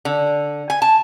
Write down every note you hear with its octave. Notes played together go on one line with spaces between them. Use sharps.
D3
G#5
A5